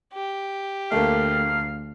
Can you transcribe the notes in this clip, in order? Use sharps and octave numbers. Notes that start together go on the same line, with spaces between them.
G4
D2 A3 A#3 F5